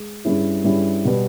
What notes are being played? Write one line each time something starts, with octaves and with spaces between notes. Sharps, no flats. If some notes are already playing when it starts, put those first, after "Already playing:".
Already playing: G#3
G2 G3 C#4 E4 G#4
G2 G3 C#4 E4 G#4
B2 G3 B3